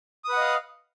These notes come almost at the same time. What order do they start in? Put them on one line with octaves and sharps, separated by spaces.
D#6 B4 F#5 D#5 F5